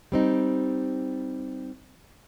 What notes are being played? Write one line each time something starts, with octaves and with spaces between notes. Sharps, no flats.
G3 C4 D#4